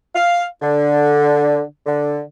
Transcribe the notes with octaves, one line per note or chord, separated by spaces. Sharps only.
F5
D3
D3